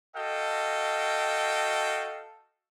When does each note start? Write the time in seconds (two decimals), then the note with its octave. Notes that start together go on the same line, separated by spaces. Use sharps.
0.16 F#4 A4 D#5 F5 G5